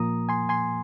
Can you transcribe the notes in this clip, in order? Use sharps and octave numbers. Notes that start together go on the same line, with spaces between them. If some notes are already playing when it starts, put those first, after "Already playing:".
Already playing: A#2 F3 A#3 A#5 D#6
G#5 C6
G#5 C6